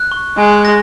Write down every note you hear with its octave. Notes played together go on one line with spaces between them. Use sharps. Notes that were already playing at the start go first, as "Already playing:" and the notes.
Already playing: F#6
C#6
G#3 G#5
A#6